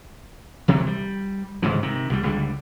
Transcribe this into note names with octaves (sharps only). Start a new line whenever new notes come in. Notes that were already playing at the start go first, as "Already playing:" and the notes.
D2 C3 E3 F#3
G3
G1 G#2 C#3 E3
C3 D#3
C2 B2 G3
C#2 D3 G3